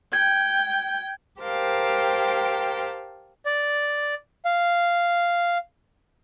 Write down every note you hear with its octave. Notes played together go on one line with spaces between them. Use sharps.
G5 G#6
G4 A#4 C5 F5 G5 A5
D5
F5